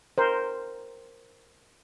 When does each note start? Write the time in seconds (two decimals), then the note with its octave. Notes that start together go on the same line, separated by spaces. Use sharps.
0.18 A#4 C5